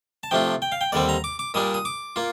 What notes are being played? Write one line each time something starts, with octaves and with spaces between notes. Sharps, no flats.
A5
C3 F3 A3 D4 F4 G5
G5
F5
G5
D#2 D3 G3 C4 D5
A#5
D6
D6
A#2 G3 A#3 D4 D#6
D#6
D6
A#3 F4